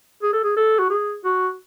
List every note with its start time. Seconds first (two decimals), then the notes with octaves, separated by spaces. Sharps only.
0.23 G#4
0.33 A4
0.43 G#4
0.56 A4
0.79 F#4
0.90 G#4
1.24 F#4